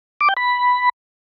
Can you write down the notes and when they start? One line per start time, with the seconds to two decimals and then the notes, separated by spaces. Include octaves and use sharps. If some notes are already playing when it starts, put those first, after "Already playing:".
0.21 D6
0.29 G5
0.37 B5